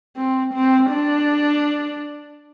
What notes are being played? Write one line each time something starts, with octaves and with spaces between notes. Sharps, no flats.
C4
C4
D4